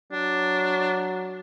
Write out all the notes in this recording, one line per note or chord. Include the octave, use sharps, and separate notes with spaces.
F#3 D4